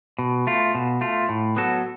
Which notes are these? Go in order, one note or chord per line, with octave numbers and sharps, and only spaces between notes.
B2
A3 F4
B2
A3 F4
A2
F#3 B3 F#4 A4